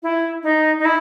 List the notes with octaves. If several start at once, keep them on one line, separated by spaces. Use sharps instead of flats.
E4
D#4
D#4
E4